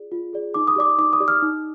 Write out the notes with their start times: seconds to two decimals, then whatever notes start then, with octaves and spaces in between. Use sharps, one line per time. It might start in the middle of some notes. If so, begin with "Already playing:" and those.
Already playing: F4 G#4 D5
0.12 F4
0.33 G#4 D5
0.54 D#4 D6
0.68 D#6
0.76 G4 D5 D6
0.98 D#4 D6
1.13 D#6
1.20 G4 D5
1.28 F6
1.42 D#4